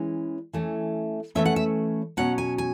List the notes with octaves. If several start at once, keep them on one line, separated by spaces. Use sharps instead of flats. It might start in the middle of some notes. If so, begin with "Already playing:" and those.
Already playing: E3 G#3 C#4
E3 A3 C#4
E3 A3 C#4 E5
F#5
E5
B2 F#3 C#4 F#5
G#5
G#5